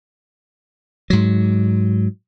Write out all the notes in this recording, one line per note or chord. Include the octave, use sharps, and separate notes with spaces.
G#2 F#3